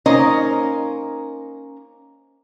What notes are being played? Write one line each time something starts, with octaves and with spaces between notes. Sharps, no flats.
A#3 C#4 D#4 A#4 C5 D#5